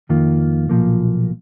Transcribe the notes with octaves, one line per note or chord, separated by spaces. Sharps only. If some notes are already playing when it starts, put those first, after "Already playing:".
F2 D#3 A#3 F4
B1 A#2 F3 A#3